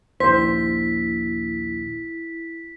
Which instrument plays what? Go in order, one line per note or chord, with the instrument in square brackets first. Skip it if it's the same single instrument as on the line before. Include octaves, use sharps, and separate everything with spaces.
[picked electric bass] A#1 D#2 [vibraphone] E4 [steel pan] C5 [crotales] B6